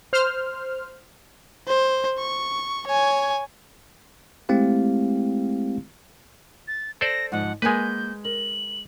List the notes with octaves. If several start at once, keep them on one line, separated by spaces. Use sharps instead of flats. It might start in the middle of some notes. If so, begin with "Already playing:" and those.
C5 F6
C5
C#6
C#5 G#5
G#3 A3 C4 E4 G4 F5
A6
A4 C5 D5 A#6
G#2 F3 F#5
G#3 A#3 B4 F#5 G#5 G6
A#4 F#7